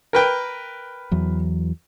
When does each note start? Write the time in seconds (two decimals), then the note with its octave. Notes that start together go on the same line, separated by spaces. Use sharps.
0.13 A#4 B4 G5
1.12 E2 E3 F#3